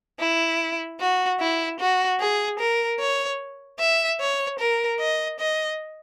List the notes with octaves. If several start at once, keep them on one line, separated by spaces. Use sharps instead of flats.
E4
F#4
E4
F#4
G#4
A#4
C#5
E5
C#5
A#4
D#5
D#5